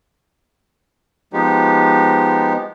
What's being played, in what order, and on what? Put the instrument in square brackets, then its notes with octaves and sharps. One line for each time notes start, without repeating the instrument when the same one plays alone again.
[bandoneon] F3 G#3 B3 D#4 G4